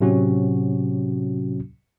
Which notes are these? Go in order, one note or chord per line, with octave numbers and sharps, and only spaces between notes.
A2 C3 F#3 C#4 F#4